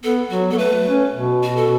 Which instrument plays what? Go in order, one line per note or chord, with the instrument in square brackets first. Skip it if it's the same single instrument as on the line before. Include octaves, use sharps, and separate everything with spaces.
[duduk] B3 [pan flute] A4
[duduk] F#3 [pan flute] F#4
[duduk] B3 [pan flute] A4
[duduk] A3 [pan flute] B4
[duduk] C#4
B2
[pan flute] F#4
A4